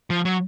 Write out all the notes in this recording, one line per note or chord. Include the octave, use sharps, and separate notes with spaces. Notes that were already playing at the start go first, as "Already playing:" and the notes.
F3
F#3